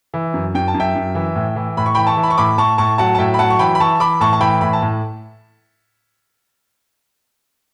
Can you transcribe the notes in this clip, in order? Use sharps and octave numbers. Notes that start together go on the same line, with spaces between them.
E3
F#2
F#2 G5
A5
F#2
E5 G5
F#2
E3
A2
E3
A2 B5
C#6
E3 G5 B5
A5 C#6
E3
B5
C#6
A2 B5 D6
A2 A5 C#6
A2 A5 C#6
F#3 F#5 A5
A5
A2 E5 G5
B5
F#3 F#5 A5
C#6
E3 G5 B5
B5
E3 A5 C#6
E3 B5 D6
A2 A5 C#6
A5
E3 G5 B5
A2 B5
A5
A2